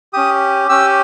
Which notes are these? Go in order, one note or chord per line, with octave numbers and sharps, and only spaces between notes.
C#4 G4 D#6
C#4 G4 E6